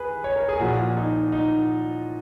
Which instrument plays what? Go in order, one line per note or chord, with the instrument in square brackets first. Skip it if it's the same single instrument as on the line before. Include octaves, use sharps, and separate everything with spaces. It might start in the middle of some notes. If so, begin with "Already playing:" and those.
Already playing: [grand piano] G#4 B4
C#5
A#4
G#4
A#2 F3 F#4
D#4
D#4